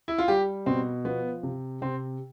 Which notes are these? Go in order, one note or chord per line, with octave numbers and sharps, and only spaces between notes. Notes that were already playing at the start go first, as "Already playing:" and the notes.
E4
F4
G3 G4
B2 C4
F3 B3
C3
C3 C4